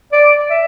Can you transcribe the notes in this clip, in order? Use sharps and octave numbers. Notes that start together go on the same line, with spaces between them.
D5
E5